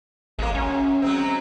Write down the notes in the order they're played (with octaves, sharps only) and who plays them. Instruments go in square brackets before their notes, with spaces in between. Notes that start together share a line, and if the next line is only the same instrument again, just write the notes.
[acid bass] A1 [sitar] G#3 A#3
[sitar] F#2 [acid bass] C#4
[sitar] F#3 G#3 C4